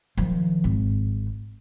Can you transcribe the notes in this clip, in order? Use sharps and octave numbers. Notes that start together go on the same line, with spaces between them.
D#3 F3
G#1